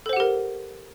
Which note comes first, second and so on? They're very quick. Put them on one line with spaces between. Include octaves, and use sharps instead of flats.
A4 C5 F#5 G4 A#4